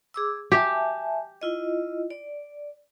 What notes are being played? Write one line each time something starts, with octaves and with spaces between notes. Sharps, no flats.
G#4 D6 E6
G4 E5 G#5 A5
E4 F4 D#5
D5